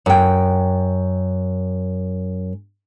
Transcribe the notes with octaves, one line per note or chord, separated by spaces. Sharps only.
F#2 G5